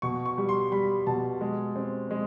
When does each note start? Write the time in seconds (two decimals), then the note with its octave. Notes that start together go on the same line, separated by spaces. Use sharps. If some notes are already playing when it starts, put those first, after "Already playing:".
0.02 B2 C#6
0.25 C#6
0.38 G3
0.49 C6
0.72 G3 B5
1.07 B2 A5
1.41 G#3
1.76 C4
2.11 G#3